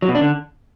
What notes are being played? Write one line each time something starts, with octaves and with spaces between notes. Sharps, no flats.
F#3
B2
D4
D3